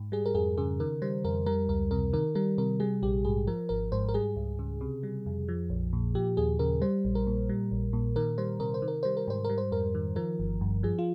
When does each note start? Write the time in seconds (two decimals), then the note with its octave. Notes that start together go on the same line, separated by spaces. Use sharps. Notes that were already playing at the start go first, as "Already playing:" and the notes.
Already playing: G#2
0.12 G3 G#4
0.26 A#4
0.34 F2 G#4
0.58 C#3 G#4
0.80 D#3 A#4
1.02 G3 C5
1.25 F2 A#4
1.46 G3 A#4
1.69 C#2 A#4
1.91 C3 A#4
2.13 D#3 A#4
2.35 G3 A#4
2.58 C3 A#4
2.80 G3 G#4
3.02 A#1 G4
3.25 G#2 G#4
3.47 F3 A#4
3.69 G#1 A#4
3.92 G#2 C5
4.09 A#4
4.14 G3 G#4
4.36 C#2
4.59 C#3
4.81 C3
5.03 G3
5.26 F2
5.48 F3
5.70 A#1
5.93 A#2
6.15 F3 G4
6.37 D#2 G#4
6.59 C#3 A#4
6.82 G3 C5
7.05 A#1
7.15 A#4
7.27 A#2
7.49 G3
7.72 A#1
7.93 A#2
8.16 D#3 A#4
8.38 G3 C5
8.60 C3 A#4
8.74 C5
8.82 D#3
8.88 A#4
9.03 G3 C5
9.17 A#4
9.28 G#2 C5
9.44 G3 A#4
9.58 C5
9.71 F2 A#4
9.95 D#3
10.16 F3 A#4
10.39 G1
10.61 G2
10.83 F3 G#4
10.99 F4